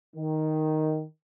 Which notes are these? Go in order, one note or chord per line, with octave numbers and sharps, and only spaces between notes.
D#3